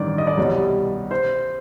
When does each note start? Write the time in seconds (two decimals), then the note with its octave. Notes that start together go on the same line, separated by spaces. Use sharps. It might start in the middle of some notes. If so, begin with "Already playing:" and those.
Already playing: A1 G2 D#3 D5
0.18 D#5
0.27 D5
0.37 C2 B2 G3 C#5
1.11 C5